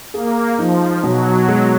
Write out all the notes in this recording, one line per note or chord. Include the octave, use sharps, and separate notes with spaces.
A#3 G#4
F3 D#4
B2 F#3
G#3